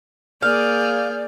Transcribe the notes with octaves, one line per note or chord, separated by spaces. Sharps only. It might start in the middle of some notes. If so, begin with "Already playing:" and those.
A#3 G#4 D5 F5 F6 G6